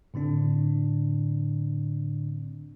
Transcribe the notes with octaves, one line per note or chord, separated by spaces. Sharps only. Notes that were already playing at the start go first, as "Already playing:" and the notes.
A2 D3 C4 D4